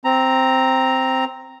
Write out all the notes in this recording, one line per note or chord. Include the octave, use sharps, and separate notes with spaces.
C4 A#5